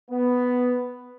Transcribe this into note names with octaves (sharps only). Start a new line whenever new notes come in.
B3